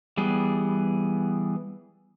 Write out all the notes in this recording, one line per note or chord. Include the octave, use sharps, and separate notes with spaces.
E3 G3 B3 G#4